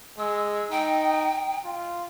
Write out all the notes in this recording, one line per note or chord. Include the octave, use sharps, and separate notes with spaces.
G#3 E6
D#4 G5
F4